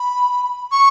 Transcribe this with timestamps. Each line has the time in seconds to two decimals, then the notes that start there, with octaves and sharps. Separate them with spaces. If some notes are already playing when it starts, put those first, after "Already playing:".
Already playing: B5
0.72 C#6